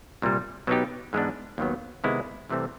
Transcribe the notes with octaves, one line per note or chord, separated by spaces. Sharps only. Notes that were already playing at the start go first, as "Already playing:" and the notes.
C2 A#2 G3
B2 F#3 B3 D#4 G4
G#2 E3 G#3 B3 D4
D#2 D#3 F#3 B3
C3 D#3 G#3 B3 E4
C2 C3 E3 A3 C4